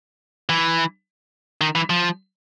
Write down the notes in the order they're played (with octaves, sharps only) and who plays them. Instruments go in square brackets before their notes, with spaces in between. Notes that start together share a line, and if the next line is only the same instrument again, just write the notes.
[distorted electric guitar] E3
D#3
E3
F3